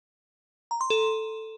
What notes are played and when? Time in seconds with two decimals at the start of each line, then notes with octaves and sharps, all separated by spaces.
0.71 A#5
0.81 C6
0.90 A4